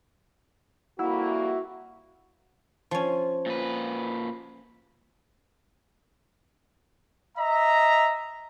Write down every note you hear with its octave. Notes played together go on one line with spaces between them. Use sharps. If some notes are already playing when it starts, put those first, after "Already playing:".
F2 G3 A#3 E4 F#4 F#5
F3 C#4
A#2 B4
D#5 E5 A#5